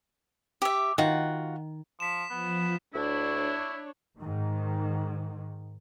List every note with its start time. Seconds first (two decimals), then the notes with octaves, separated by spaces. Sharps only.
0.62 G4 E5
0.98 D#3 F4 F#4 F#5
2.00 F3 B6 E7
2.31 F3 B3
2.94 D2 D4 E4 C#5
4.18 G#2 D#3